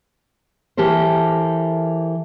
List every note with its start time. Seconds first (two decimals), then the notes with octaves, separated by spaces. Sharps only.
0.77 E3 G4 A4 A#4 C5